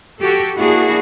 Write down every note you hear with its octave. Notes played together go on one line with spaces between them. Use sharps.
F#4 G4 A4
A#3 D4 E4 F#4 G#4